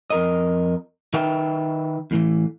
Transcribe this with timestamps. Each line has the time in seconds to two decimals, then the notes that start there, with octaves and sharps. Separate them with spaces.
0.10 F2 A#4 D#5
1.13 D#3 D#4 B4 E5 G5
2.11 E2 A2 E3